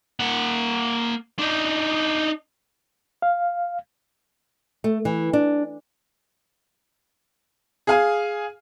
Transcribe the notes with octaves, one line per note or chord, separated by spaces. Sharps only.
A#3 F#5
D4 D#4
F5
A3
E3
D4
G#4 F5 G#5